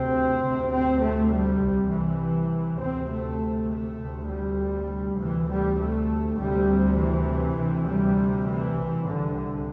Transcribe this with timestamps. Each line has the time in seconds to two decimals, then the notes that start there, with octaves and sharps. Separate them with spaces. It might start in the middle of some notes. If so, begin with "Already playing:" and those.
Already playing: D2 C3 C4
0.43 D2 C3
0.72 C4
1.01 A3
1.31 G3
1.61 C2 C3
1.91 E3
2.80 D2 C3 C4
3.11 A3
3.70 A3
3.99 D2 C3
4.29 G3
5.18 D2 C3 E3
5.49 G3
5.78 A3
6.37 D2 C3 G3
6.97 E3
7.57 D2 C3
7.87 G3
8.46 E3
8.75 C2 C3
9.06 D3